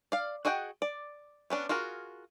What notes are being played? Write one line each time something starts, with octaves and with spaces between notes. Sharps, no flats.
D5 F5
F#4 G#4 D#5 F#5 G5
D5
B3 C#4 D4
F4 F#4 G#4 A#4